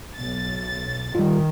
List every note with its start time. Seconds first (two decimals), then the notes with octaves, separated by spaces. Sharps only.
0.15 B1 A6
1.15 D#3 G3 F4